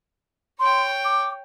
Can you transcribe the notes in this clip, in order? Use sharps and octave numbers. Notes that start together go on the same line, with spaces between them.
C#5 G5 C6
D6